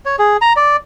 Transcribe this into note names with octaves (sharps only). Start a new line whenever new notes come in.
C#5
G#4
A#5
D5